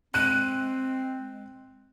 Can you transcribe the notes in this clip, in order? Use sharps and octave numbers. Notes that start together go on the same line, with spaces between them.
G#3 C4 F#6 D#7